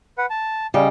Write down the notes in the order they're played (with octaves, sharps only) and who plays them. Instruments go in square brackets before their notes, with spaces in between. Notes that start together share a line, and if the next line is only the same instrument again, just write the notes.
[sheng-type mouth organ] B4 F#5
A5
[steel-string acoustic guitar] C#3 G3 D#5